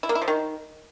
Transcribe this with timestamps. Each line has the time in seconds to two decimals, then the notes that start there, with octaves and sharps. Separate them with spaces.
0.03 E4
0.09 A#3
0.15 E4
0.22 F3
0.28 D#3